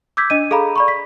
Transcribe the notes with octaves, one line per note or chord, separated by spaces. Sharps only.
D6 E6 G6 G#6 B6
D4 D#5 D#7
G#4 A4 F5 A#5 B5
D5 B5 C#6
B6